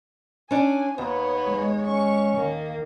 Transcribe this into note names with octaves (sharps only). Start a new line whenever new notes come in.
C#4 D4 G#5
D#2 B3 D#4 C#5
G#3
C#4 C#6
D#3 A#3